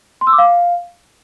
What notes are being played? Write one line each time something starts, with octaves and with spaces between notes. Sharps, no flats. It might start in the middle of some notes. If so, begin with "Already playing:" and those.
C6
E6
D6
F5